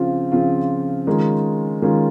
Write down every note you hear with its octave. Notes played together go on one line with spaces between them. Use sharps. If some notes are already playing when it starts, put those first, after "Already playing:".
Already playing: C#3 F3 C4 F4
C#3 F3 C4 F4
D#3 G#3 C#4 F4
D#3 G#3 C#4 F4